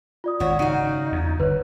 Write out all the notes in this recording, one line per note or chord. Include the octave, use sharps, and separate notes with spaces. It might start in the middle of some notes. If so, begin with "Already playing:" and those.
F4 D5 D#6
G#1 G#2 F#4 C#5 E5 F#5
C#3 D#4 F#4 F5
E2
G1 B4 C#5